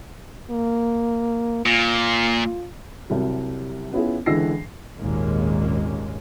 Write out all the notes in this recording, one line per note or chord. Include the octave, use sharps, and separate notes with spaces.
A#3
A#2 F4
C2 C3 F#3 G3
B3 C#4 E4 F4 G#4
C#2 D3 E3 E6 A#6 C7
G#1 D#2 A#2 G#3 A#3 C#4